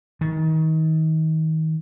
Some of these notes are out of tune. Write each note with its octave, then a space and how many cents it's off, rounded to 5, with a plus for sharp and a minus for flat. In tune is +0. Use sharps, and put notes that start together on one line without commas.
D#3 +30